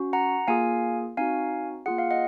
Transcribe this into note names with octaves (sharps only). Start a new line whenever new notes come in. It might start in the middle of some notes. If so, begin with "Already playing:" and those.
Already playing: C#4 F#4
F#5 A#5
A#3 F4 G#4 F5 G#5
C4 D#4 F#4 F5 G#5
A#3 F4 G#4 F#5
F5
D#5 F#5